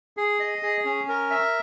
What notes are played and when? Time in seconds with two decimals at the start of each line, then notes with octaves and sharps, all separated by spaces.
0.17 G#4
0.40 D#5
0.63 G#4
0.85 C#4
1.08 A#4
1.30 E5